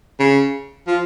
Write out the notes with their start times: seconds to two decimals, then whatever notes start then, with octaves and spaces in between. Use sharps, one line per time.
0.19 C#3
0.87 F3